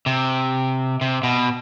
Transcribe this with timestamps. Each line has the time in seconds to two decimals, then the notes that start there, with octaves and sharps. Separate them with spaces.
0.06 C3
1.01 C3
1.23 B2